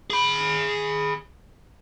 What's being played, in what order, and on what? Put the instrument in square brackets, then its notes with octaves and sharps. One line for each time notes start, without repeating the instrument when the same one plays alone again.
[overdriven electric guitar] G#4 B5